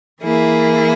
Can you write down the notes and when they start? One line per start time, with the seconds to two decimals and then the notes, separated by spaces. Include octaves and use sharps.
0.22 E3 A#3 E4 G#4